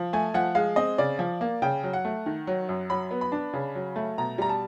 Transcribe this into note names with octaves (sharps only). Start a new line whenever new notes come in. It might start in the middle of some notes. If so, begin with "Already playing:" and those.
Already playing: F3
A3 G#5
F3 F#5
G#3 F5
C4 D#5
C#3 D5
F3
A#3
C#3 G5
F#3
F#5
A3
D#3
F#3
F#2
F#3 B5
B3
B5
D4
C#3
F#3
A3
B2 A#5
G3 A#5
A5